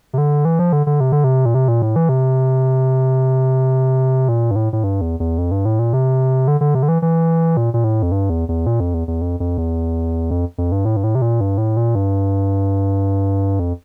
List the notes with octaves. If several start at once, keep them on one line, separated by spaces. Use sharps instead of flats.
C3
D3
E3
F3
D3
D3
C3
D3
C3
A#2
C3
A#2
A2
E3
C3
A#2
G2
A2
A2
G2
E2
E2
F2
G2
A2
A#2
C3
D3
D3
C3
D3
E3
E3
A#2
A#2
A2
F2
G2
E2
E2
A#2
F2
E2
E2
F2
F2
E2
F2
F2
G2
A2
G2
A2
C3
A#2
G2
A2
A#2
G2
F2